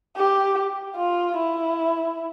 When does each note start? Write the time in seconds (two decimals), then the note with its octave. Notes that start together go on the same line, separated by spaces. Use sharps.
0.17 G4
0.96 F4
1.37 E4